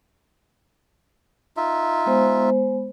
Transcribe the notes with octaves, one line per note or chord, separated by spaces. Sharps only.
D#4 F4 E5
G#3 B3 C5